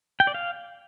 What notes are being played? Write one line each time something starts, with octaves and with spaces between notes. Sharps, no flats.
G5
D5
F5